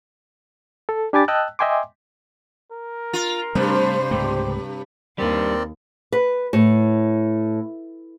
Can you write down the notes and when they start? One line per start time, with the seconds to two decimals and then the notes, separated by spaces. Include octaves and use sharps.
0.89 A4
1.13 D4 G4 G#5 B5 D6 A6
1.28 D#5 G5 A5 E6 F#6
1.59 D#5 E5 G5 G#5 C6 D6
2.72 A#4
3.13 F4
3.55 G2 C3 G3 A3 D4 C5
4.11 C#2 G#2 A3 G4
5.18 D#2 G3 C4 D4 A#4 D5
6.12 B4
6.53 A2